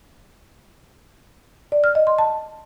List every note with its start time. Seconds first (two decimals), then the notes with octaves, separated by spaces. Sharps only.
1.72 D5
1.84 F6
1.95 D#5
2.07 C6
2.18 A5